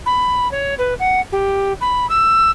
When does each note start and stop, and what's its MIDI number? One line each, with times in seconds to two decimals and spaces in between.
0.05 0.50 83
0.51 0.74 73
0.78 0.94 71
0.99 1.20 78
1.32 1.73 67
1.80 2.08 83
2.09 2.50 88